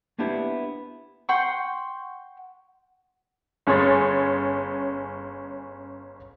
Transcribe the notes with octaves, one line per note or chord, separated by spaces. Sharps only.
A#3 B3 D4 E4 G4 C5
F#5 G5 C6 C#6
G1 C#4 G#4 C#5 C6 A6